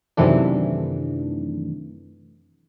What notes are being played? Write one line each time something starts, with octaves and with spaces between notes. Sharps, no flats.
F#2 C3 D#3 E3 A3 D4